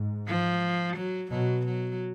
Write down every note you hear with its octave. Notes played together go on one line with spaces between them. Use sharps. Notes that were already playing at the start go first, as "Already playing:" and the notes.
Already playing: G#2
F3
F#3
B2 F#3
F#3